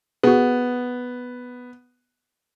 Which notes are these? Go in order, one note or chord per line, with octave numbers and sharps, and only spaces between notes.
B3 F#4 G#4